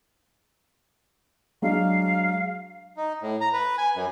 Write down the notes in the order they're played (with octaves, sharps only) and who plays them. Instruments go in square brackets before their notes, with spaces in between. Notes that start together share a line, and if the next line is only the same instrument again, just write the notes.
[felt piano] F#3 G#3 D4 [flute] F5
[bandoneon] D#4
A2
A#5
B4
G#5
F#2